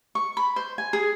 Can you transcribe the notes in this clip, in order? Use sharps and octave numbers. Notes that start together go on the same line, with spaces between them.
C#6
B5
C5
G#5
G#4